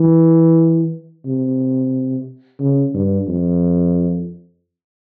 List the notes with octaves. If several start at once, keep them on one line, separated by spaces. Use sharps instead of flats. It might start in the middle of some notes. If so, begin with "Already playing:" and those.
Already playing: E3
C3
C#3
G2
F2